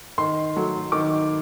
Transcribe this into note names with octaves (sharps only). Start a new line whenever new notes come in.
D#3 C6
F#3 A3
D#3 D6